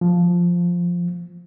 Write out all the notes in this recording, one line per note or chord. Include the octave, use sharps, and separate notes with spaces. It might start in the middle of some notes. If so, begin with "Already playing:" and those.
F3